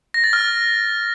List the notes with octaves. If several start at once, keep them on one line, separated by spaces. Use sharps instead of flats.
A#6
A6
F6